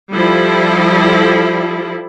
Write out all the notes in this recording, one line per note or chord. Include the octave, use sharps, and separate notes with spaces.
F3 G3 E4 A4